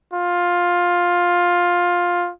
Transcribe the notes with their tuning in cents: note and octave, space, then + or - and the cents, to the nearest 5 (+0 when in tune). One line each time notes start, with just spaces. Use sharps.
F4 +15